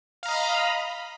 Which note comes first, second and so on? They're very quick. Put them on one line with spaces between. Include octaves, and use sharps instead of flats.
F5 A#5 D#5 B5